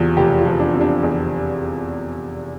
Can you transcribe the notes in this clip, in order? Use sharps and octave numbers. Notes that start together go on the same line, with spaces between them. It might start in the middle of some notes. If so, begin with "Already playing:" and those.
Already playing: E2 C3 F4
F1 G4
F4
F3
D4
C3
D4
E2